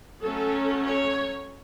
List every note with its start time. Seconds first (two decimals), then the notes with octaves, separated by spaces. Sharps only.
0.22 F#3 A3 C#4 A4
0.85 C#5